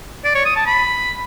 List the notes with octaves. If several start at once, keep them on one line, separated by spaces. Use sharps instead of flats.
D5
C#5
D#6
A5
B5